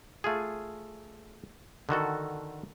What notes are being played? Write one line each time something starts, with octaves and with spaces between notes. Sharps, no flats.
A3 F4 G#4
D3 D#3 F#4 A4